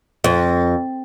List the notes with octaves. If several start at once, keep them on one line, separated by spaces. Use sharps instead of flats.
F2